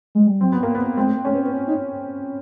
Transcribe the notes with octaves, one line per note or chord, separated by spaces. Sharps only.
G#3
G3
F#3 C4
B3
A#3
B3
G#3 C4
A3
A#3
A3 C#4
B3
B3
C#4
D#4